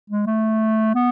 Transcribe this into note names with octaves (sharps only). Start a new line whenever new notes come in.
G#3
A3
B3